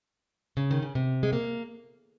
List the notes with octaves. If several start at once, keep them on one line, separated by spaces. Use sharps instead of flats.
C#3
D#3
C#3
C3
G#3
A#3